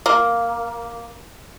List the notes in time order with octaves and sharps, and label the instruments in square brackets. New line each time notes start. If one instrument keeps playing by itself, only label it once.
[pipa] A#3